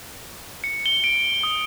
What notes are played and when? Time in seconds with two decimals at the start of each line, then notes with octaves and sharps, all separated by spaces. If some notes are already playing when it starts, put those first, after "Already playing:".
0.64 C#7
0.86 G7
1.04 D7
1.43 D#6